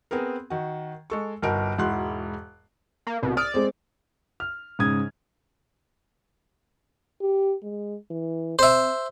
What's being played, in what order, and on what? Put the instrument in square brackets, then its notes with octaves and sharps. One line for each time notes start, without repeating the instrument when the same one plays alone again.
[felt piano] B3 C4 G#4 A#4
D#3 F#4
G#3 A4 C#6
G1 C2 D#4 F#4 A#4 D7
E1 G#2 E4 F#4 C6 F#6
[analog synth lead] A#3
[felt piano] C2 [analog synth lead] B2
[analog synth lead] D5 [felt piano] D#6 F6
[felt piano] G#3 C4
[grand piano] F6
G#2 C#3 D#6 G#6
[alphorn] G4
G#3
E3
[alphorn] C4 [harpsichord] C5 E5